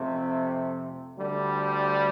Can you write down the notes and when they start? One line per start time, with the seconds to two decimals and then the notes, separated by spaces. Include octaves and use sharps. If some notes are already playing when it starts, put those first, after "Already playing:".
Already playing: F2 C3 A3 C4
1.17 D2 D3 G3